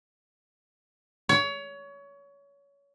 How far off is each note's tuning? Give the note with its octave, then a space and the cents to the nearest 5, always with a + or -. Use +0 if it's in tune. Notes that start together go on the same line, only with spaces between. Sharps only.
C#5 +25